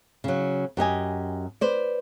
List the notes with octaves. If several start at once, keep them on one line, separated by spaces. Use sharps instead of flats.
C#3 F#3
F#2 G4 D#5 G#5
B4 C5 D5